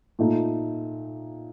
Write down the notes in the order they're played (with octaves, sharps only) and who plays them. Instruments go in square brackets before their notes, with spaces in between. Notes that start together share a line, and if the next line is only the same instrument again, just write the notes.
[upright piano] A#2 A3 D#4